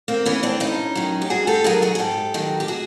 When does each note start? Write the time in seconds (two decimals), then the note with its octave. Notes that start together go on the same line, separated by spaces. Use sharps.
0.08 A#3 C4
0.26 E3 B3 C#4
0.43 C4 D4
0.60 G2 C#4 D#4
0.95 D#3 F#3
1.22 G4
1.30 G2 F#4 G#4
1.47 G4 A4
1.64 D#3 F#3 G#4 A#4
1.82 F#4 G#4
1.95 G#4
1.99 G#2 G4 A4
2.34 D#3 F#3
2.60 G4
2.68 F#4 G#4